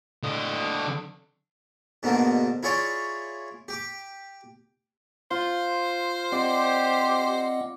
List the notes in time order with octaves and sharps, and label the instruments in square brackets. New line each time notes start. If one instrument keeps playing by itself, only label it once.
[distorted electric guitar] D3 D#5
[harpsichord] G#2 B2 D3 A#3
E4 F4 G#4 C#5 D5 C6
G4 D6
[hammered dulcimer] F4 [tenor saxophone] C5
[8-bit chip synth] C4 D#5 F#5 [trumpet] G4 [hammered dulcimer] D5